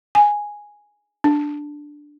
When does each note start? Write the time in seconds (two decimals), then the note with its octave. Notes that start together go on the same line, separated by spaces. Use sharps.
0.15 G#5
1.24 D4